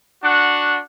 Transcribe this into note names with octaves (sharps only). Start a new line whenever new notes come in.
D4 F#4 F#5